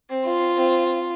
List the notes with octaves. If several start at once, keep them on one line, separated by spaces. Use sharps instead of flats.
C4
F4
C4